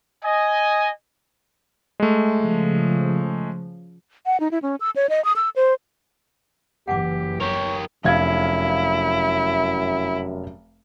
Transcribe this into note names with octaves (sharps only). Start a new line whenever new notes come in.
D#5 G#5
G#3 A3
C#3 F3
F#5
D#4
E4
C#4
E6
C#5
D#5
D#6
E6
C5
F#1 E3 G4 F#5 G#5 D6
G4 A#4 C#5
F1 F#2 E4 F5 G#6